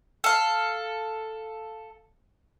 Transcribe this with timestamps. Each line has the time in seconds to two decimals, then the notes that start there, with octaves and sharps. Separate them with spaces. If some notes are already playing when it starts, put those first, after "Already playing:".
0.24 A4 F5